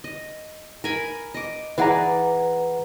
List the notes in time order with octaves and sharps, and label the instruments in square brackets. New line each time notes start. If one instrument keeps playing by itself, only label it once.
[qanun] D#5
A#4 G#5 B5
D#5 D6
[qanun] E3 G#4 D5 [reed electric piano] B4 F#5 A#5